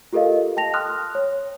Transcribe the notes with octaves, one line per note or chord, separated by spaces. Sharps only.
F4 G4 A4 A#4 D#5 F5
G5 A5 A#6 F7
C6 D#6 F6 F#6
C#5